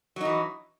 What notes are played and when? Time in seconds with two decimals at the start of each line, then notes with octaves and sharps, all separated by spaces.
0.16 F#3
0.21 D#4
0.25 E3